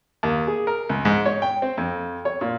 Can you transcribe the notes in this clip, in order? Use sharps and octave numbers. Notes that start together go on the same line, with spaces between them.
D#2
G#4
A#4
C#2
G#2
C#5
G5
C4
F2
C#5
A#2